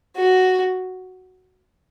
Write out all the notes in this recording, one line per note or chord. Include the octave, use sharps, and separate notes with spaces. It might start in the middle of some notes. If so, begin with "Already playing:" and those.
F#4